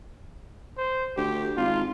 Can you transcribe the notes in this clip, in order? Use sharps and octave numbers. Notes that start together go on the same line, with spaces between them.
C5
D2 G4
G#1 F4